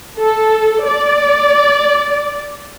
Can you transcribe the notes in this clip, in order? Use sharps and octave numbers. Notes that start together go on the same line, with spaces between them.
A4
D5